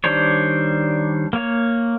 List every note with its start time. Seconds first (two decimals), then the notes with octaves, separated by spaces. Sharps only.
0.04 D#3 G3 D4 C5 C#5
1.33 A#3 C#5